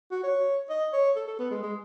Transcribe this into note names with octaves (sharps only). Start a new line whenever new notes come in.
F#4
C#5
D#5
C#5
A4
A4
B3
G#3
G#3